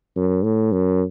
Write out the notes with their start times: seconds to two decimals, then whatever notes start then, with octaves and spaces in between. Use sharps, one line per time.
0.16 F#2
0.44 A2
0.72 F#2